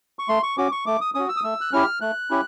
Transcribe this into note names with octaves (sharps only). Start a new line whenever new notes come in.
C#6
A3 C6
C#6
C#4 F#4 D6
C#6
A3 D6
D#6
C#4 F#4 D#6
E6
D#6
A3 E6
F#6
C#4 E4 G4 F6
A3 F#6
C#4 E4 G4